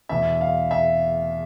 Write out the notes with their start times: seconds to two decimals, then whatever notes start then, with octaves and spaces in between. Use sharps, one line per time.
0.09 E2 B2 E5
0.41 F5
0.71 E5